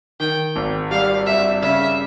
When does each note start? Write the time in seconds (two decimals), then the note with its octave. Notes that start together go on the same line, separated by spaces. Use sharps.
0.20 D#3 G5
0.56 G#1
0.91 G3 F5
1.26 G2 E5
1.62 C#3 E5